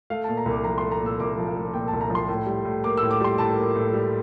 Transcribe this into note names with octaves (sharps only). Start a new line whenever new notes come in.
A3 F5
A#2 A5
A#5
C2
D6
F3 A#5
A3 C6
A#5
A#2 E6
C2 D6
F3
F5
A3
A#2 G5
C2 A5
A#5
F3
C6
A2
G3
A2
A#3 D6
A2 E6
D6
G3 C6
A2 A5
A#3
A2
G3